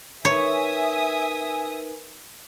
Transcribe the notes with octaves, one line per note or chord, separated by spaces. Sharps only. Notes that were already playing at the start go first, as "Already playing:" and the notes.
D#4 A#4 B4 C#5 E5 G#5 D#6